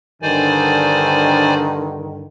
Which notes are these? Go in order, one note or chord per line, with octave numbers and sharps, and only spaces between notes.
G2 D3 D#3 C5 D5 G#5